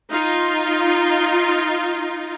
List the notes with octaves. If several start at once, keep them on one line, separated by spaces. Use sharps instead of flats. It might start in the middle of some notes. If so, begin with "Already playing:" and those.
D#4 F4